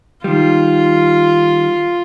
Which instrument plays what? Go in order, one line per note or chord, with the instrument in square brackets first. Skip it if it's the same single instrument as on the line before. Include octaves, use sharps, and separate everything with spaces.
[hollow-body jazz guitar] D#3 G3 [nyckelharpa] F4